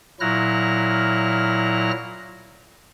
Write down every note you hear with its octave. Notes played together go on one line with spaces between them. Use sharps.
A#2 F#3 E4 F6 F#6 A#6